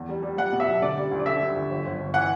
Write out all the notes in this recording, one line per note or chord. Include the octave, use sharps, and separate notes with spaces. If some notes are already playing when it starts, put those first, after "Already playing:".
Already playing: E2
G3
G3
G3 F#5
B2
E5
B1
D3 D5
G3
D2
D5
D3 E5
G3
D2
G1
G1
G1
E3 F#5